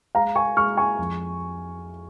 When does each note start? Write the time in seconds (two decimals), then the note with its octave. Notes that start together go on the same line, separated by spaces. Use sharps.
0.15 G#3 F5 A#5
0.35 G#5 C#6
0.57 G#3 C#6 F6
0.77 G#5 C#6
0.99 F2